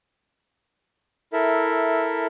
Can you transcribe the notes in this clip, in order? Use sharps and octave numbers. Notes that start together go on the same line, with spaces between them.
E4 A4 A#4 E5